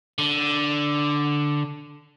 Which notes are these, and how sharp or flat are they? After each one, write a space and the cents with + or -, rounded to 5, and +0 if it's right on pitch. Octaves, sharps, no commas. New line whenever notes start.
D3 +0